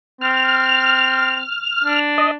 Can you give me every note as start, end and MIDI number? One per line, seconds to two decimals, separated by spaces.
0.21 1.41 60
0.21 1.99 89
1.84 2.35 62
2.18 2.31 75